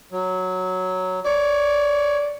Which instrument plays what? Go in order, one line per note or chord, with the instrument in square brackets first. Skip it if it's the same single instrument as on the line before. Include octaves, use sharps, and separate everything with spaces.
[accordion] F#3
[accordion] C#5 [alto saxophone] D5